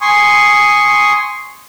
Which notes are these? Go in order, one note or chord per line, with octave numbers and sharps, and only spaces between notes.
G#5 C6 C#6 D#6